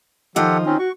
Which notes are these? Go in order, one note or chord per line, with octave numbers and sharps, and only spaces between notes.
D#3 F3 F4 G4 A4 D#5 F#5
C4 C#4 D#4
F#4 C#6